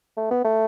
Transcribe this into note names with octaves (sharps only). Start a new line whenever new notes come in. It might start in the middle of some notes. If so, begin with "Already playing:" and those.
A3
B3
A3